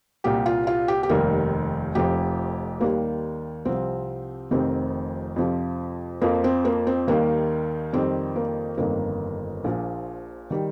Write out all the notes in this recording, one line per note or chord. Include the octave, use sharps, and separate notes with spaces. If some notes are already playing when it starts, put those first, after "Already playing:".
C2 A#2 G3 G4
F4
F4
G4
G4
F1 D#2 D#3 G3 A#4
F1 F2 F3 G4
D#2 D#3 G3 A#3
C2 C3 F3 C4
F1 F2 C3 D#3 C4
F2 C3 F3
F2 F3 A#3
C4
A#3
C4
D#2 D#3 G3 A#3
F2 D#3 G3 C4
A#3
G1 F2 D#3 A#3
A#1 A#2 F3
D#3 G3